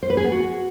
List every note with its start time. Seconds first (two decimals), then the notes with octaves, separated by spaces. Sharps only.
0.03 C5
0.10 B4
0.17 G#4
0.24 B3
0.32 F#4